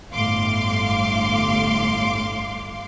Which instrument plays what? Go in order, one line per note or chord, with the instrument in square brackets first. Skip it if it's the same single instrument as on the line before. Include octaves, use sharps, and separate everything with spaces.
[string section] G1 A2 F5 C6 D6